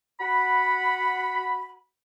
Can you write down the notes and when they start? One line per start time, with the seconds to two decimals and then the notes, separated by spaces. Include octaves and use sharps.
0.20 F#4 F#5 B5